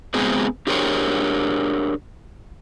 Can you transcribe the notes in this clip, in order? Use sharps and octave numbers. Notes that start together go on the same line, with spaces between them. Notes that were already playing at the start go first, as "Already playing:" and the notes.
G#3 B3 C4 G#4 C5
D4 G4 G#4 A#4 C5 C#5